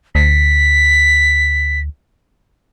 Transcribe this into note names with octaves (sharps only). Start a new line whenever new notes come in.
D2 B6